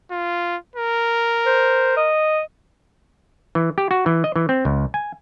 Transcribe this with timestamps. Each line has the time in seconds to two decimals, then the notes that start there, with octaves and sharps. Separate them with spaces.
0.11 F4
0.76 A#4
1.46 C5
1.97 D#5
3.55 E3
3.78 G4
3.91 F#4
4.06 E3
4.24 D#5
4.36 E3
4.49 C4
4.65 C#2
4.94 G#5